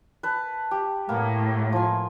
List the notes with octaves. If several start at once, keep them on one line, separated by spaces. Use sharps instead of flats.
B4 A5
G4
A2 A#3 B3
F3 G#5